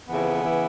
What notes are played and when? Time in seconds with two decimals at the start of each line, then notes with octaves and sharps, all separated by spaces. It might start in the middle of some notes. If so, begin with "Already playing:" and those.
0.09 F2 C#3 E3 B3
0.45 C#3 E3